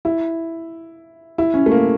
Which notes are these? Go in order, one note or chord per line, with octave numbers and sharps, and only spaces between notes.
E4
E4
C#4
A3
A#3